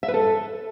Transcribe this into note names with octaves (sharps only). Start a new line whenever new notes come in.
E5
B4
A4